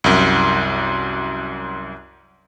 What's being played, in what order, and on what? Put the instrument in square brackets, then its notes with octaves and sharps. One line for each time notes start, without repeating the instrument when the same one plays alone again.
[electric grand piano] C2 F#2